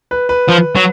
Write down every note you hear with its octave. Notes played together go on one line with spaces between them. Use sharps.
B4
B4
F3
F#3